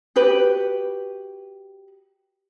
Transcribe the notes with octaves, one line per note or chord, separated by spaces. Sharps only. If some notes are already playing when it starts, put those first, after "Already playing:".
F#4 G4 B4